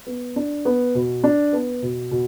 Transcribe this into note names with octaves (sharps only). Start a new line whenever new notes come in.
B3
D4
B3
B2
D4
B3
B2
B2